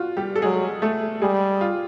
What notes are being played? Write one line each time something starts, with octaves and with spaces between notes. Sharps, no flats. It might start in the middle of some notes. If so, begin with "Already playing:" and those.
Already playing: F4 F#4
G3 G4
A4
F#3 G#3 G#4
A3 A4
G3 G#3 G#4
F4